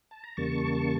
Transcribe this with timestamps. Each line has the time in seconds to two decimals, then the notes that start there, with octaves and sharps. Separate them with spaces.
0.11 A5
0.24 A#5
0.37 E2 C#3 G3 A#3 A5 C#6